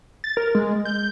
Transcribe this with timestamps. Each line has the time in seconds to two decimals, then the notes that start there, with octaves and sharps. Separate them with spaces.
0.24 A6
0.37 A#4
0.55 G#3
0.85 G6